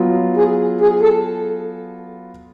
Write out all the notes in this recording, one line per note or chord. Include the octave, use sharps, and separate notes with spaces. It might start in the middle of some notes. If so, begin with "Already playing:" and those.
Already playing: F#3 B3 F4
G#4
G#4
A4